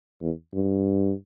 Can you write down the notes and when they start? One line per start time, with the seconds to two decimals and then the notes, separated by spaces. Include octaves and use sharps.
0.22 E2
0.54 G2